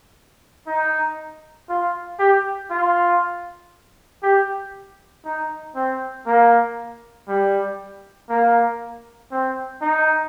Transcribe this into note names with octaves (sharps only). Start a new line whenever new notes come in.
D#4
F4
G4
F4
G4
D#4
C4
A#3
G3
A#3
C4
D#4